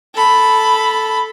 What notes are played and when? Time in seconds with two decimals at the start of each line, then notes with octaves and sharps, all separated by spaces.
0.14 A4 B5